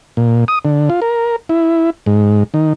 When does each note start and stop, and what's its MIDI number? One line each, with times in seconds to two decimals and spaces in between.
0.17 0.45 46
0.48 0.59 87
0.65 0.89 50
0.90 1.00 65
1.02 1.36 70
1.49 1.90 64
2.06 2.44 44
2.54 2.73 51